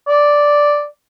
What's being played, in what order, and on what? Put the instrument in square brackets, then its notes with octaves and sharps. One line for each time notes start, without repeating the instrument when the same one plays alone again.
[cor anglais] D5